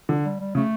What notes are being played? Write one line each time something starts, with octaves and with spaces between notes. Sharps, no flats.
D3
G3
G3
C#3 A3